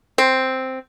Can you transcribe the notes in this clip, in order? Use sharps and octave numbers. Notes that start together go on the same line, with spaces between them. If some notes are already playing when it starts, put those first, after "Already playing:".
C4